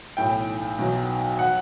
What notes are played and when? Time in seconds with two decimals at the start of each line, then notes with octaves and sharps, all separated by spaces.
0.17 B1 A2 E3 G5
0.78 B1 B2 F#3
1.39 F#3 F#5